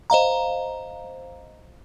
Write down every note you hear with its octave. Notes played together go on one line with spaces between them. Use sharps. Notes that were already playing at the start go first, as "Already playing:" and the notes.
C5 D#5 F5 A#5